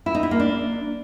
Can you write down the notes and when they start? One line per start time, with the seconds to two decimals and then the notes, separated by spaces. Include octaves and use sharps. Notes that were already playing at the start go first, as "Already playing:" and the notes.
0.06 E4
0.15 D#4
0.23 E4
0.31 A#3
0.40 D4